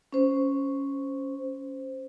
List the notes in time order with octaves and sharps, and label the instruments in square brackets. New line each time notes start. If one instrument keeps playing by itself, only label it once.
[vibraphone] C#4 C5